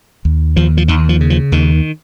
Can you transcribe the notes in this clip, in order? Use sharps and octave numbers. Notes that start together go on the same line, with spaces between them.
D#2
D#2 F3
F3
D#2 D#3
F3
C#3
F3
D#2 D#3